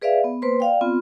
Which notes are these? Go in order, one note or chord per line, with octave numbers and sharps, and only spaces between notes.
G#4 B4 D5 E5 F5
B3
A#3 B4 C5 C6
D5 F5 G5
B3 C4 F4